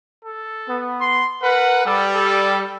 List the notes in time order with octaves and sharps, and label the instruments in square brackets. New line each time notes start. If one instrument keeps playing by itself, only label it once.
[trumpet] A4
[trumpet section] B3
[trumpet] C6
[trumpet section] A#4 B4 [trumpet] F#5
[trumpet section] G3 [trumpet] A4
[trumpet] A4